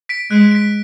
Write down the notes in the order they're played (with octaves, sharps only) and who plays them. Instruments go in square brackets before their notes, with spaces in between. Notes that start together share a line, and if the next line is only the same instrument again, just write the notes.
[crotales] B6 D7
[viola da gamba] G#3 [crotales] F#6
[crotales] B6 D7